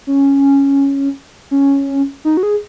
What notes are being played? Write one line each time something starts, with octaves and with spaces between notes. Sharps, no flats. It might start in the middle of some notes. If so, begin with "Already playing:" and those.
C#4
C#4
D#4
F#4
G#4